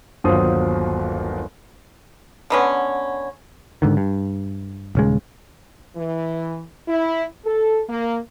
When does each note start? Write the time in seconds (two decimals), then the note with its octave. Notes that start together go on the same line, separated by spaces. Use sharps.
0.24 G1 D#2 F#3 F4 C5 D#6
2.50 D3 B3 C#4
3.82 G#2 D3 D#3
3.97 G2
4.95 D#1 C#3 G#3
5.96 E3
6.87 E4
7.45 A4
7.88 A#3